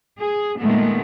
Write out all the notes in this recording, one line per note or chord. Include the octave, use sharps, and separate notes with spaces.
G#4
A#2 D#3 G#3 A3 B3